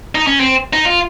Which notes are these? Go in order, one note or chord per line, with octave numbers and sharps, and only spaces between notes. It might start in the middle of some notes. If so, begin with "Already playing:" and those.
D#4
C#4
C4
D#4
F4